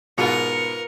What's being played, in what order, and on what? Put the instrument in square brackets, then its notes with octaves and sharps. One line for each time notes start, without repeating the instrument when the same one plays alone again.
[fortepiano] G#2 B2 [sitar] B3 F4 [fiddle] A#4 [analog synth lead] C#7